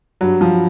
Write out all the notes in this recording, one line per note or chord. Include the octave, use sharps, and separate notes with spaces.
G2 F#3
F3